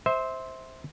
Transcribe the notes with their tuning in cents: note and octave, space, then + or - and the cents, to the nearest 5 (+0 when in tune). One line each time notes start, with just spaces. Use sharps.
C5 +0 E5 -25